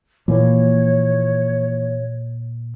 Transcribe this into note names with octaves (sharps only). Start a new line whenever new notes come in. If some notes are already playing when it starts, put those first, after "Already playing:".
A#2 E3 F3 A#3 C#5